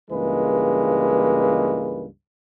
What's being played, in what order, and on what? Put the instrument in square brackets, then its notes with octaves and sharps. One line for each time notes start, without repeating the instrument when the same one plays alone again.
[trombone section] C#2 G2 E3 G#3 A#3 B4